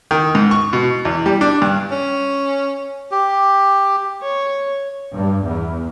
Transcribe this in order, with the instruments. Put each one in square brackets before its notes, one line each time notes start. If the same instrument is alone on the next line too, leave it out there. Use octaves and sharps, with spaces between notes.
[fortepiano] D#3
G#2
C#6
B2
E2
G3
D4
G2
[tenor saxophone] C#4
[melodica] G4
[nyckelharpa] C#5
[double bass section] G2
E2